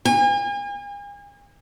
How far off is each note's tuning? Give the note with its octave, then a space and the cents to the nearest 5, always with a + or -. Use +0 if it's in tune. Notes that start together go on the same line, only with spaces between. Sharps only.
G#5 -40